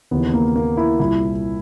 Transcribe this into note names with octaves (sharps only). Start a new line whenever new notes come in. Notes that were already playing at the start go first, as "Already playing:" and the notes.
D#2 C#3 E3 B3
A#3
A#3
E4
C2 A#2 E4